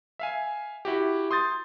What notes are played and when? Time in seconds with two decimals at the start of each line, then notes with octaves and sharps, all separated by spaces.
0.19 E5 F5 G#5
0.85 E4 F#4 G4
1.31 C6 D#6 G6 A6